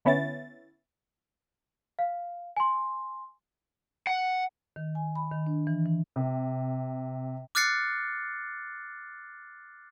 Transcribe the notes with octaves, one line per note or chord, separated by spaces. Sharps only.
D3 B3 C#4 E4 A6
F5
G#5 C6
F#5
D#3
G#5
B5
D#3
D4
E3
E3
C3
D6 F6 F#6 A6 C7 C#7